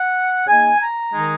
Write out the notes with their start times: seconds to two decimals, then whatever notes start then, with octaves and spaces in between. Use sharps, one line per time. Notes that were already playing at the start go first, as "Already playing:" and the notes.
Already playing: F#5
0.47 C#3 A#3 D#4 G#5
0.80 A#5
1.13 D#3 G#3 D#4